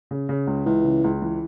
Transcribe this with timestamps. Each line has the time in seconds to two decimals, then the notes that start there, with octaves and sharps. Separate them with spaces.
0.11 C#3
0.29 C#3
0.47 C#2
0.66 C#2 E3
0.85 C#3
1.04 C#2
1.22 E3